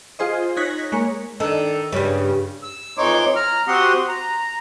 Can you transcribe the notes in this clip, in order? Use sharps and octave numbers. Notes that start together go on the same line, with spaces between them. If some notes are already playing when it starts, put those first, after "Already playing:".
F4 G#4 C5 D#5
D#4 C#5 F#6 G#6 A#6 B6
G#3 A#3 C#5
D#3 D4 A4
G2 C#3 G3
E6
F2 E3 D#4 C#5 C6 D6
A#5 F6
C4 F#4 G4 F#5 C6 D#6
A#5